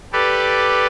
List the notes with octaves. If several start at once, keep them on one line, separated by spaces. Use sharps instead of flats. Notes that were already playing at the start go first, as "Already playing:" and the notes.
G4 A4 B4 D5